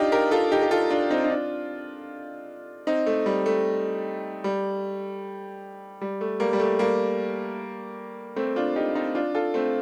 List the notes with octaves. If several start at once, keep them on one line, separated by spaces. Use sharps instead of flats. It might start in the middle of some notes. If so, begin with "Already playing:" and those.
Already playing: D4 D#4 F4 G4
G4 A#4
F4 A4
D#4 G4
G4
F4 A4
D4 F4
C4 D#4
D#4
D4 F4
C4 D#4
A3
G3
A3
G3
G3
A3
G3 A#3
G3
A3
G3 A#3
A3 C4
D4 F4
D#4 G4
C4 D#4
D4 F4
F4 A4
A3 C4